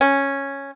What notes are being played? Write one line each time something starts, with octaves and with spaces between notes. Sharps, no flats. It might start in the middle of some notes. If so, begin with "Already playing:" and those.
C#4